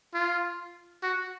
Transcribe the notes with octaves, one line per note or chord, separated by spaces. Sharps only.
F4
F#4